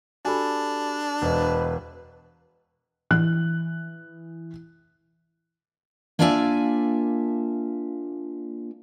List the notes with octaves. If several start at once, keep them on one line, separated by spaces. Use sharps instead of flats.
D4 F#4 G4 A4 G#5 B5
E1 B4 C5 D#5
E3 F#6
A#3 D4 F4 D5 E5 G#5